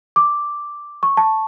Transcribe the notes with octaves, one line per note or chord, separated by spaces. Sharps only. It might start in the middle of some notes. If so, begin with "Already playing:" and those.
D6
C#6
A5